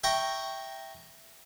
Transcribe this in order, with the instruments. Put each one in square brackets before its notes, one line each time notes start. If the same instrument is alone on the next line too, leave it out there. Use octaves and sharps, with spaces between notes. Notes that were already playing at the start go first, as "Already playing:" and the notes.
[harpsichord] E5 G5 A#5 C#6